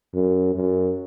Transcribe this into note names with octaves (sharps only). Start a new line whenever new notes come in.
F#2
F#2